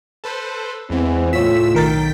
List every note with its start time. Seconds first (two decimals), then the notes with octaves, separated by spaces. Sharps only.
0.24 A4 B4 C5
0.90 E2 E3 G#3 B3 C4
1.33 C#2 A2 A3 F4 C#5 E6 B6
1.75 B1 D#3 A#4 G5 A6 B6